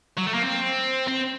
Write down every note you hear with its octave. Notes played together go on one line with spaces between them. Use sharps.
F#3
A3
A#3
C4
C4